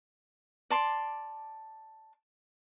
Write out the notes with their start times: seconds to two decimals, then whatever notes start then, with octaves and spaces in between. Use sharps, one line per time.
0.70 D5 A5 C6